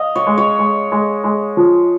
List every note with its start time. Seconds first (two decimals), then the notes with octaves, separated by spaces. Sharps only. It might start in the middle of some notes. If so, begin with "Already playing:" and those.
Already playing: D#5 F5
0.16 C#5
0.27 G#3
0.38 C#5
0.59 G#3
0.92 G#3
1.24 G#3
1.57 F3